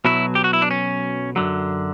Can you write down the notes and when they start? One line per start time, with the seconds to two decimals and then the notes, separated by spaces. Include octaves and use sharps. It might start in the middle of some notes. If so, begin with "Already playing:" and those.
0.05 B1 B2 F#3 E4
0.35 G4
0.44 F#4
0.53 E4
0.62 D4
0.71 C#4
1.36 F#2 D3 F#3